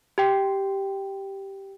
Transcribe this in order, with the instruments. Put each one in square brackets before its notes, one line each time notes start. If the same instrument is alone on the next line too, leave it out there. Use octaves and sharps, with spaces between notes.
[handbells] G4 G5